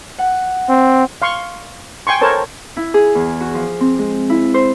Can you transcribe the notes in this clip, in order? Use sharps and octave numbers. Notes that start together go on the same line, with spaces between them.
F#5
C4
F5 C6 C#6
G5 G#5 C6 C#6
A4 A#4 C5 C#5 A5
E4
G#4
E2
F#4
F3
C4
G#3
E4
C5